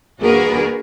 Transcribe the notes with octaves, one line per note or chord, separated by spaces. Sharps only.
A#3 D4 F#4 G#4 A#4 B4